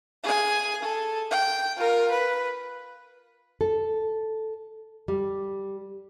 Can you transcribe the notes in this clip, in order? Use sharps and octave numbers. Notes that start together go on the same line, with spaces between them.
G#4 G#5
A4
G5
F4 A#4
B4
A4
G3